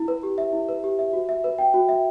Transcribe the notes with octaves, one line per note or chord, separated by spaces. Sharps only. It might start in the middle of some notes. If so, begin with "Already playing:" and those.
Already playing: E4
B4
G4
E5
E4
B4
G4
E5
F#4
E5
B4
G5
F#4
E5